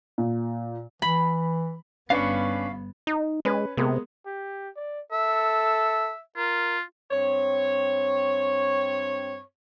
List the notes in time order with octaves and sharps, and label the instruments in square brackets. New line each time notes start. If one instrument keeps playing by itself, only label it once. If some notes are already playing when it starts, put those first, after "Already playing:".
[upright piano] A#2
[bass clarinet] E3 [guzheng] B5
[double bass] G1 B3 [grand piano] C#4 D4 B4 [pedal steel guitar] F5 C#6
[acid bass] D#4
[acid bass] G#3 [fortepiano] C#4 B4
[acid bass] C3 [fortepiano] G#3 A#3 B3
[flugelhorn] G4
D5
[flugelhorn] A4 [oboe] E5
[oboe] F4 [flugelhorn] A#4
[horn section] G2 C4 C#5